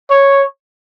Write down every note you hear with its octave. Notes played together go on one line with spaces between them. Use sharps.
C#5